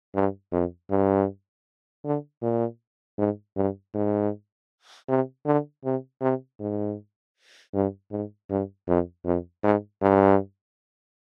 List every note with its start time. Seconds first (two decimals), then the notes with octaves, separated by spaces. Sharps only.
0.15 G2
0.52 F2
0.91 G2
2.05 D3
2.43 A#2
3.18 G#2
3.57 G2
3.95 G#2
5.09 C3
5.46 D3
5.84 C3
6.22 C3
6.60 G#2
7.74 G2
8.12 G#2
8.50 G2
8.88 F2
9.25 F2
9.64 G#2
10.02 G2